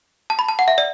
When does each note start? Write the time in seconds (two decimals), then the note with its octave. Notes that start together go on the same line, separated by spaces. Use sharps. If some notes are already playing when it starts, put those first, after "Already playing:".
0.30 A5
0.39 B5
0.48 A5
0.59 F#5
0.68 E5
0.78 D5